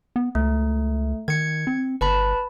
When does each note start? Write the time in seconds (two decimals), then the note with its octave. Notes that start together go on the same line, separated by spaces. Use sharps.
0.16 B3
0.35 C#2 A3
1.28 D#3 G#6 C#7
1.67 C4
2.01 G1 B4 A5 B5